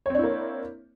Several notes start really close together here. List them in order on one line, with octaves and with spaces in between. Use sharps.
C#5 C4 D4 E4 A#3